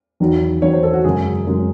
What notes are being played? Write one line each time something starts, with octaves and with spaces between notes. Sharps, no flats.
E2 D#3 F#3
E2 D#3 F#3 C#5
C5
A4
F#4
F#2 C#3 G#3 G#4
F#2 C#3 G#3